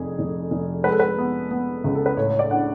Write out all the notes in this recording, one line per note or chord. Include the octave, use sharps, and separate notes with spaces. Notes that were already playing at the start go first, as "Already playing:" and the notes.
Already playing: F1 F2 G#4
F1
F1
G#3 B4
A4
B4
B3
B3
C#2
A4
B4
A2 C#5
C#5
D5
D4 F#5